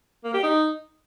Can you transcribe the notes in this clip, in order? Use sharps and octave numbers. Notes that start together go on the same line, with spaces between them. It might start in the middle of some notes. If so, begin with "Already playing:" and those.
A#3
G4
D#4